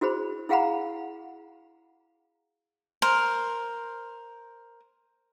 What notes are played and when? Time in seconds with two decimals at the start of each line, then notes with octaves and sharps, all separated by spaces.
0.01 E4 F#4 G#4 C5 B5
0.49 E4 G#4 F5 F#5 A#5 B5
3.02 A#4 C5